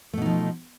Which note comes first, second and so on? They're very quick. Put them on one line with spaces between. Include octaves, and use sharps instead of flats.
A3 B2 D#4 F3